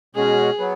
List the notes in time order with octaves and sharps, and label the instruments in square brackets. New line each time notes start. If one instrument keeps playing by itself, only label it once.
[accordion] B2 G#3 C#4 F#4 [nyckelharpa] G#4
[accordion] F#3 B3